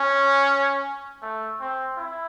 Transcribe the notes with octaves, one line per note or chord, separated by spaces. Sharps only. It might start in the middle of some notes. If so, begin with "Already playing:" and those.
Already playing: C#4
A3
C4
E4